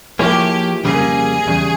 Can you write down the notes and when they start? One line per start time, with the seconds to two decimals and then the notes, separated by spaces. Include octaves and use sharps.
0.19 F3 A#3 E4 G4 G#4 C#5
0.84 F2 C#3 G3 A#3 G#4
1.47 E2 C#3 G3